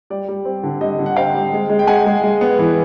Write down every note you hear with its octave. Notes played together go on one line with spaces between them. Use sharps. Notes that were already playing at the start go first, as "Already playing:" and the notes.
G3 D5
G3
C4
D3
G3 D#5
D3
F#5
C4 F5 G5
G3
G#3
G#3
G5
G#3 F#5 G#5
G#3
G#3
B3
E3